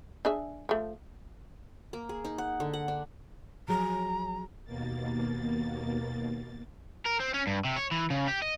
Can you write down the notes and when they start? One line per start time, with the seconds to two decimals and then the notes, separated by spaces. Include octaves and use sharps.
0.25 D4 G#4 E5
0.69 F3 A3
1.93 A#3
2.09 G#4
2.25 D#4
2.38 F#5
2.60 D3
2.73 F#5
2.88 D4
3.68 F3 F#3 G#4 A#5
4.65 D#2 B2 A#3 A6
7.05 A#4
7.20 C4
7.34 C#4
7.47 G2
7.65 C3
7.76 C#5
7.92 E3
8.10 C#3
8.28 G4
8.42 D#5